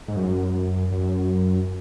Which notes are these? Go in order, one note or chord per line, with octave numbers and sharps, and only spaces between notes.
G#2
F#2
F#2